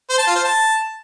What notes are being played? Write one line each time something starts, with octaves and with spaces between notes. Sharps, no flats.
C5
A5
F4
C5
A5